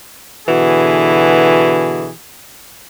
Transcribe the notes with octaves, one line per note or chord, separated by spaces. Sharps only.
B2 D3 E3 F#4 G#4